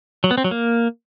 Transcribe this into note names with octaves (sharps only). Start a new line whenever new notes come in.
F#3
B3
C4
F#3
A#3